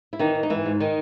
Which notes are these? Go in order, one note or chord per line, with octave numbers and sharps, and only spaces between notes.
E4
D#3 E3 D#4
E3
D#4
G#2 E3 E4
G#2
D#3 D#4